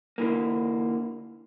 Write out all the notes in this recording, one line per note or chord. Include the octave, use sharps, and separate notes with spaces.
D2 D3 E3 A#3